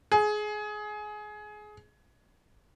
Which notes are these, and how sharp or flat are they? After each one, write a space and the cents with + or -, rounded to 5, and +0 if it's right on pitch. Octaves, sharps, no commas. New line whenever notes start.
G#4 +20